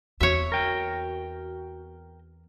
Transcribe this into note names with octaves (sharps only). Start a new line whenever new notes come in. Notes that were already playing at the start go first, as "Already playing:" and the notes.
E2 C4 F#4 C#5 E5
A#4 G5